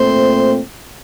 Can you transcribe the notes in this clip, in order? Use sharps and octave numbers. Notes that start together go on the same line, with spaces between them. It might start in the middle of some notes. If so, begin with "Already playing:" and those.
Already playing: A#2 A3 C4 C5